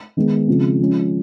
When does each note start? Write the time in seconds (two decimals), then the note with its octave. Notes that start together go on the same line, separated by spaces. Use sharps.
0.17 D#3 G#3 B3
0.48 C#3 F3 G#3 C4
0.79 F3 G#3 C#4